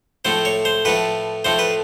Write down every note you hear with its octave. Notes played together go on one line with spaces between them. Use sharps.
A2 F3 A3 C5
C#5
C5
A2 F3 A3 B4
A2 F3 A3 C5
B4